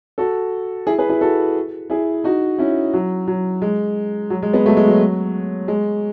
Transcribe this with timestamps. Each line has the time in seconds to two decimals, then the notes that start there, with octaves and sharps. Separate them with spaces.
0.18 F#4 A4
0.87 E4 G#4
0.98 G#4 B4
1.09 E4 G#4
1.21 F#4 A4
1.90 E4 G#4
2.24 D#4 F#4
2.58 C#4 E4
2.94 F#3
3.28 F#3
3.62 G#3
4.30 F#3
4.43 G#3
4.53 G#3 B3
4.65 F#3 A3
4.77 G#3
4.88 F#3
5.68 G#3